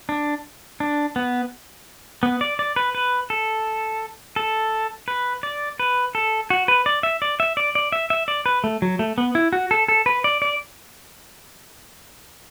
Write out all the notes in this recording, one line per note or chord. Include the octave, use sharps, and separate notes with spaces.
D4
D4
B3
B3
D5
D5
B4
B4
A4
A4
B4
D5
B4
A4
F#4
B4
D5
E5
D5
E5
D5
D5
E5
E5
D5
B4
A3
F#3
A3
B3
E4
F#4
A4
A4
B4
D5
D5